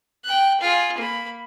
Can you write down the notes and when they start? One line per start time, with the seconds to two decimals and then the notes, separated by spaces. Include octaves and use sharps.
0.25 G5 F#6
0.61 F4 G#4
0.98 A#3 B5